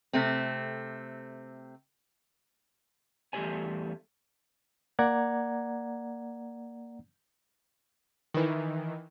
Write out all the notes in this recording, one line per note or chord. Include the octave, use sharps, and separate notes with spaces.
C3 A3 C4
E2 G3 A3 G4 C#5 G#5
A#3 D5 F#5 A#5 G#6
D#3 E3